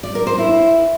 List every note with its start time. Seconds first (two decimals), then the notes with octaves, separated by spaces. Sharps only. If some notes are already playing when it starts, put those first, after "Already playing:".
0.03 D5
0.15 A#4
0.27 C5
0.38 E4